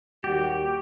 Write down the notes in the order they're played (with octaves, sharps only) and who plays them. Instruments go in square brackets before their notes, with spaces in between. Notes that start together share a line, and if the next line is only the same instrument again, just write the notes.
[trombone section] D#2 G3 F#4 [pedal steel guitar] G4